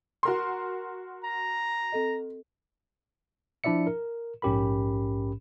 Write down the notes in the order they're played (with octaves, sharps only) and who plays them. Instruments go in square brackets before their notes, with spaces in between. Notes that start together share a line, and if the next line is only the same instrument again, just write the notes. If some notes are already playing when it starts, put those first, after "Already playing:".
[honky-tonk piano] F#4 A#4 C6
[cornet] A#5
[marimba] C4 A4 D#5
[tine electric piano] F3 D4 E4 D5 E5 C#7
A#4
A#1 G#2 C#4 G4 A#4 B5